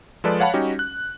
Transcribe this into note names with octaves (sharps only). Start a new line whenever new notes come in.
F3 G#3 A4 B4 D5
C#5 F5 F#5 A5 B5
G3 C#4 D#4 F#4 G4
F#6